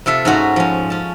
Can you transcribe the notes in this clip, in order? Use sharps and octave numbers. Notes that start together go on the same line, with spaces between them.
C3 F4 A4 E5
G#2 C#4 F#4 A#5
F3 C#4
C#4 A5